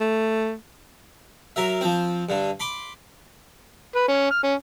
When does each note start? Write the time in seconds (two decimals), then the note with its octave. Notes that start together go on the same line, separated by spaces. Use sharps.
0.01 A3
1.56 F#3 A#4 E5
1.81 F3 C4
2.29 G2 D3
2.60 B5 C6 D6
3.96 B4
4.08 C#4
4.31 F6
4.44 C#4